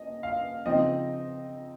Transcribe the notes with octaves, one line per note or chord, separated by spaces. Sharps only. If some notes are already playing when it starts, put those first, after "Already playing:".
Already playing: A#3 D#5
F5
C#3 F3 C4 D#4 D#5